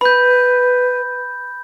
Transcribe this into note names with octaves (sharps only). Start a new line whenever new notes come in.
B4 B5 G6